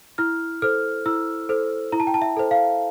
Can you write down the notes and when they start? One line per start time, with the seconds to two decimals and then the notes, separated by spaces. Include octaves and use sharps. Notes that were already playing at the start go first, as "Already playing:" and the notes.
0.18 E4 F6
0.62 A4 C5 F6
1.06 E4 E6
1.49 A4 C5
1.92 E4 A#5
2.00 A5
2.07 G5
2.14 A5
2.22 E5
2.36 A4 C5
2.51 F5